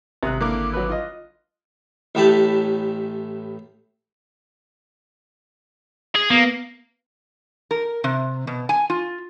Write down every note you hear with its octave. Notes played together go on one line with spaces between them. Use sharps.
G#1 C3 A#5 D#6 F#6
D3 A#3 E4 D6
F#3 B4
F4 D#5
A1 A2 A3 G4 A5 B5
G#4
A#3 B3
A#4
C3
B2
G#5
F4